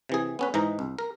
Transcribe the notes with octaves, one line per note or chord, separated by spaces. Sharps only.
C3 E3 G#4
B3 C#4 B4
G#2 E3 D#4 A#5
C2
A#4